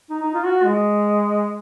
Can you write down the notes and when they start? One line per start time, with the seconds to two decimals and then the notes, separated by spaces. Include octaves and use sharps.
0.10 D#4
0.22 D#4
0.34 F4
0.45 F#4
0.64 G#3